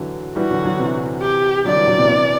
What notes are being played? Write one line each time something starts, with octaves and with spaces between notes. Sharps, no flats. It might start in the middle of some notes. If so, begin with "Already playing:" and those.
Already playing: D3 E3 F#3
E3 G3 F#4
D3 F#3
D3 F#3
C3 E3
G4
D3 F#3 D5
E3 G3
D3 F#3
C3 E3
C3 E3